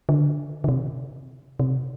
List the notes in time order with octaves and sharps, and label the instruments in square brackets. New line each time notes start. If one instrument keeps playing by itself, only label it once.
[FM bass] D3
D3
C3
C3